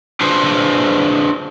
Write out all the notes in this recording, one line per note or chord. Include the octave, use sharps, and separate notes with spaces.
D4 F4 G#4 B4 C5